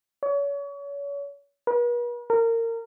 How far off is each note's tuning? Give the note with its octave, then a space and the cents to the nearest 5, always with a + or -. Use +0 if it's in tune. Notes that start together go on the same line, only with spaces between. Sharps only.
C#5 +35
B4 -45
A#4 -25